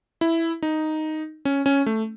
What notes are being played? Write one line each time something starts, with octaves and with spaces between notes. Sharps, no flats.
E4
D#4
C#4
C#4
A3